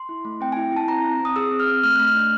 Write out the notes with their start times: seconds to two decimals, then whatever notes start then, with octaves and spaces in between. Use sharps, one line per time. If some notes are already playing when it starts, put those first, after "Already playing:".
Already playing: C6
0.09 E4
0.25 A3
0.41 C4 G5
0.52 E4 G#5
0.72 E4 A5
0.88 C4 A#5
1.04 C4
1.20 C4 D#6
1.36 G#4 E6
1.51 C4
1.60 F6
1.67 C4
1.83 A3 F6
1.96 A3 F#6
2.08 F6
2.15 D4 F#6